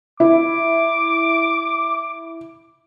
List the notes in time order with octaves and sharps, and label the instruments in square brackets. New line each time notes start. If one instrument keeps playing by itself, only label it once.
[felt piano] E4 [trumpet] D6